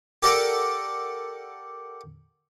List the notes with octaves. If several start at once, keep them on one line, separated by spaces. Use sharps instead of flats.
G4 A4 A#4 D5 F#5